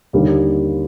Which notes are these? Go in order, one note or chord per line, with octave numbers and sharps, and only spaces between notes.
D#2 D3 G3 A#3 D#4